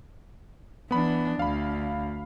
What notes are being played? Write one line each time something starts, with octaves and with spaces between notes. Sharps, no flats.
E3 B3 D4 B5
D2 F5 B5